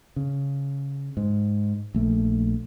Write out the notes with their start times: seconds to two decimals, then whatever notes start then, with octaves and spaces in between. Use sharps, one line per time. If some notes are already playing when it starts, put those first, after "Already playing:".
0.16 C#3
1.17 G#2
1.94 A#1 A3